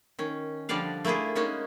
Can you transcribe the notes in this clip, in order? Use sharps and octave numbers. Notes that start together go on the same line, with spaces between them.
D#3 C#4
D3 F3 G3 D4 D5 F5
A3 A#3 E4 F4 G#4
G#3 A#3 C#4 D#4 F#4